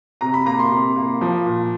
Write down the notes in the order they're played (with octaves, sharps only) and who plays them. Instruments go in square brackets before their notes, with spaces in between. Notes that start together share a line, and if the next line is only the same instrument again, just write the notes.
[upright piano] C3 A#5
B5
A#3 A#5
C6
C3
A#3
F3
A#2